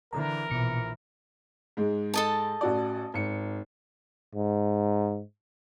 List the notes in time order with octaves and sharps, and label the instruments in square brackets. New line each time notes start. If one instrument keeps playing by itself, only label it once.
[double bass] D3 E3 [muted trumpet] A#4 [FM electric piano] A#5
[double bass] A#1 E3 [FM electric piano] B2 C#7
[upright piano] G#2 G#3
[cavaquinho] A4 D#5 A5
[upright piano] A1 F#4 D5
G#1 C#7
[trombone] G#2